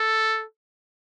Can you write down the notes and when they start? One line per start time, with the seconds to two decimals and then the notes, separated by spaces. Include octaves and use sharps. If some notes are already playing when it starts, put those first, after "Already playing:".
Already playing: A4